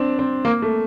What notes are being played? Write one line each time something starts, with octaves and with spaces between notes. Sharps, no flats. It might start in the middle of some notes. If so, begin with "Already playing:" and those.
Already playing: C4 D4
C4
A#3
A3